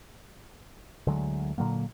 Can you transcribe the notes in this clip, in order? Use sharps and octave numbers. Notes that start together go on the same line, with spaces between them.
D2 D3 F#3 G#3
A#2 D3 F#3 A#3